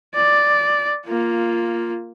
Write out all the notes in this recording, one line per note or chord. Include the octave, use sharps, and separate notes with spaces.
D5
A#3 F4